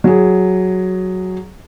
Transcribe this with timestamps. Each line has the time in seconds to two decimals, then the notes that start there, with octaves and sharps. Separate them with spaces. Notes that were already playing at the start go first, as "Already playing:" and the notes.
0.04 F#3 G#4